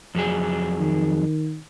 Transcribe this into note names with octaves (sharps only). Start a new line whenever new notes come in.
F2 F#3 G#4
D#3